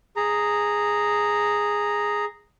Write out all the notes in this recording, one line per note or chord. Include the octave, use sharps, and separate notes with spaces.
G#4 A#5